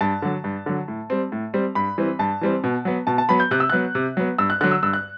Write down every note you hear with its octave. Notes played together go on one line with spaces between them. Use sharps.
G2 A5
D3 F#3
G2
D3 F#3
A2
G3 C4
A2
G3 C4
G2 B5
E3 G3 C4
G2 A5
E3 G3 C4
B2
F#3 B3
B2 A5
A5
F#3 B3 B5
G6
C3 F#6
E6
F#3 B3 F#6
C3
F#3 B3
G2 E6
F#6
D3 F#3 F#6
E6
G2 E6
F#6